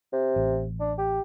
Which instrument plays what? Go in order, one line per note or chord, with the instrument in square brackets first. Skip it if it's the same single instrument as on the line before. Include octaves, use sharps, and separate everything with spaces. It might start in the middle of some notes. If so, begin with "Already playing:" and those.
[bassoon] C3
[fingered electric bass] A1
[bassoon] D4
G4